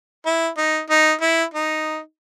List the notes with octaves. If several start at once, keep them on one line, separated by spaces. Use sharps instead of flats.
E4
D#4
D#4
E4
D#4